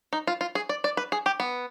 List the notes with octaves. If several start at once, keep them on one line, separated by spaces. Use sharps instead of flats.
D#4
F4
F4
G#4
D5
D5
B4
G#4
G4
B3